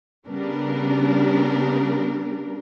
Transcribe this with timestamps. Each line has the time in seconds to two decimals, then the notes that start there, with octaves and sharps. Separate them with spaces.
0.27 C#3 G3 B3 D4 A#4